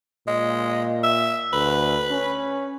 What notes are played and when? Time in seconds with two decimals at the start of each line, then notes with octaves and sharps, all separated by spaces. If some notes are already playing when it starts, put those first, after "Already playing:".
0.27 A#2 G#3
1.04 E5
1.53 D2 B4
2.12 C#4